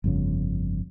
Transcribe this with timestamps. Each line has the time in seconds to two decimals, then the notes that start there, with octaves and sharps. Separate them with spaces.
0.04 G1 F2 C#3